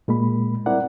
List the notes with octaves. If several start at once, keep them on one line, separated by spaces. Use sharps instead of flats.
A#2 G#3 A#3 B5
G3 C4 E4 A#4 D5 F#5